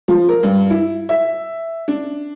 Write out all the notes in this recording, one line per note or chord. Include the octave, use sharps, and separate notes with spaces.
F3
A#4
G2
E4
E5
D4